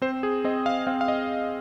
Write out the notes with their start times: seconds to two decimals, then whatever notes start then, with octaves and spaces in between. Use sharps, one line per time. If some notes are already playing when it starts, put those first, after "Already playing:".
0.02 C4 C5
0.23 G#4
0.44 C4 D#5
0.66 F5
0.87 C4 F5
1.01 F5
1.08 D#5